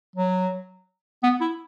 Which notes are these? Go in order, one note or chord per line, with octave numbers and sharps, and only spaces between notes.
F#3
B3
E4